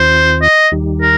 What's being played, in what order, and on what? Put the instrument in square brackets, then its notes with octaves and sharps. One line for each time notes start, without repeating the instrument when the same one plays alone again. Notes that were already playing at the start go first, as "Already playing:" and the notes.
Already playing: [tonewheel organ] D#2 D#3 C4 F4 [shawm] C5
[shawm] D#5
[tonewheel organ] D#2 D#3 G3 D#4 G4
[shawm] A#4